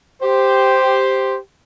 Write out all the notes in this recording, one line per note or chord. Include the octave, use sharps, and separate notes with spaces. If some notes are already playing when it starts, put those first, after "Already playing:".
G4 C5